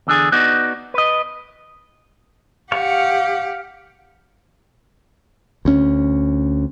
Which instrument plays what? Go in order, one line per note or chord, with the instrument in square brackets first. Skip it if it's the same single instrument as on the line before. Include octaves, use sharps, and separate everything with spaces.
[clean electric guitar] E2 D3 D4 G#4
B3 D#4 F#4 D5
B4 D#5
[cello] G4 F#5 [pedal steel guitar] F5 C#6
[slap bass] D2 C#4